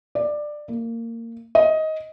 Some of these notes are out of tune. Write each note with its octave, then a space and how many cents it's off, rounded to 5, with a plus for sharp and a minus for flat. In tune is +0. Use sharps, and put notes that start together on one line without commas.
D5 +15
A#3 -20
D#5 +15